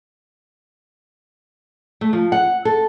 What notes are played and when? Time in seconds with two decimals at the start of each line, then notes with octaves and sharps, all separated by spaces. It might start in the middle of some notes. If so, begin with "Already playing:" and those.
2.01 A3
2.13 F3
2.32 F#5
2.65 A4